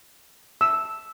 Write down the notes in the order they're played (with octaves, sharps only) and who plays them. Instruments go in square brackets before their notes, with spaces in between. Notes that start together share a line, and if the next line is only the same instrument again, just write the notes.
[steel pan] E6